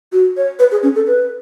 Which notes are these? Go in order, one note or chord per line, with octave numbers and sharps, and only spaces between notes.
F#4
C#5
B4
G#4
C#4
A4
B4